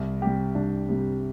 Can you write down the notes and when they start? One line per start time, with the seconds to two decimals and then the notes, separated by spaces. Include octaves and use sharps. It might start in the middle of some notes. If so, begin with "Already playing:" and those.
Already playing: C2
0.21 C3 G3 G4
0.55 C2 D4
0.88 C3 G3